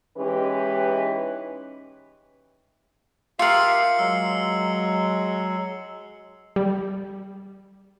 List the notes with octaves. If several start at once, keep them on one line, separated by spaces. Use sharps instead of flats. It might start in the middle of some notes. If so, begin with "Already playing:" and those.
E3 G#3 C#4 D#4 G4 B4
F4 G4 A#4 E5 F5 C7 C#7 F#7
F#3 G#3 E6
G3